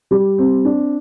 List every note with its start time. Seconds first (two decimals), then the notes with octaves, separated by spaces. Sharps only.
0.11 G3
0.38 C4
0.65 D4